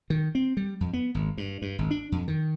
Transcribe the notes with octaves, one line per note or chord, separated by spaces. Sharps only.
D#3
C4
G3
F2
B3
G#1
G2
G2
G#1
D4
F2
D#3